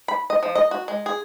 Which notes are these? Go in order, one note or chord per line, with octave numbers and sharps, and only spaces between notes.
B5
D#5
F3
D#5
F#4
G#3
G#4